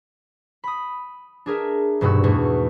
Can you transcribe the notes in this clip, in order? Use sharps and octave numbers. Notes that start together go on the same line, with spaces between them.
B5 D#6
D4 G#4 A#4 E5
D#1 G2 B2 F#4 E6
E2 G#2 B2 A3